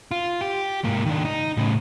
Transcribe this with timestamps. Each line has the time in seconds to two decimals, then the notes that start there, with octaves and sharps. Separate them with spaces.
0.11 F4
0.41 G4
0.84 G#2 A#3
1.06 D#3 D4
1.25 D#4
1.57 A2 C#3